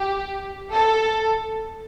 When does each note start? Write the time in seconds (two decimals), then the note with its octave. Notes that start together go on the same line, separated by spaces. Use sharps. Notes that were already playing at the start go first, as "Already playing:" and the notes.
Already playing: G4
0.73 A4